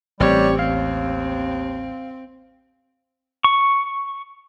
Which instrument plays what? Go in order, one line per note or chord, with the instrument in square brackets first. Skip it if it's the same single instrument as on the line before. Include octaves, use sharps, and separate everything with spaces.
[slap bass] A1 [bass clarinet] G3 [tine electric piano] C4 G4 [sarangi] C#5
[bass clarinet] D#2 [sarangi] C4 [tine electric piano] F5
[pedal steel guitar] C#6